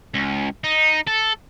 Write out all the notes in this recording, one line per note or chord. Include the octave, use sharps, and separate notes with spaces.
C#2
D#4
A4